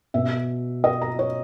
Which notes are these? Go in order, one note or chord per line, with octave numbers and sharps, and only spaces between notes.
B2 E5
D#5
A#5
C#5